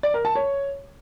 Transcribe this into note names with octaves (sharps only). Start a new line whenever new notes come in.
D5
A#4
A5
C#5